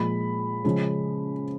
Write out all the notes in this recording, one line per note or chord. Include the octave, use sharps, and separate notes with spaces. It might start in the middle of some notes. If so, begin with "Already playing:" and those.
Already playing: A#2 F3 G#3 B5
C#3 F3 G#3